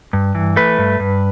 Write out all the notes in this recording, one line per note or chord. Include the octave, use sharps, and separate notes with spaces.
G2
E3
A3 B4
G2
G2